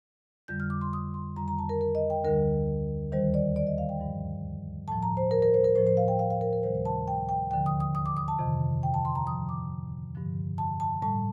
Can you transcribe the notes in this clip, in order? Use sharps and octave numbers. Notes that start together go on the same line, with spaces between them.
F2 D3 G3 G6
F6
D6
C6
D#6
C6
F2 D#3 G3 A#5
A#5
A5
A#4
A#4
D#5
G5
D2 D3 G3 A#4
D#2 D#3 G3 C5
D5
D5
D#5
F5
G5
G2 F3
A2 F3 A5
A#5
C5
A#4
A#4
C5
A#4
A2 F3 C5
C5
F5
G5
F5
F5
A#4
A#4
D2 C3 D#3 G3 C5
C5
A5
G5
G5
D#2 D3 F3 G5
D#6
D#6
D#6
D6
D#6
A5
F2 C3 D#3
G5
A5
C6
A#5
A2 F3 D#6
D6
G2 D3 F3
A5
A5
A2 G3 A5